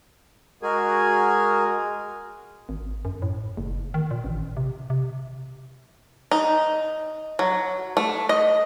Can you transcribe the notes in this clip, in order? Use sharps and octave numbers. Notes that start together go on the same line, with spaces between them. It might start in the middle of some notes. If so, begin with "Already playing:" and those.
G#3 F#4 G#4 A#4 G#5
G#1
F#2
A2
F#1
D#3
A#2
A1
C3
C3
D#4
F#3
A3
D#5